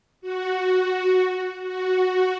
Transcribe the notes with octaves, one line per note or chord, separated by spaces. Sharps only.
F#4
F#4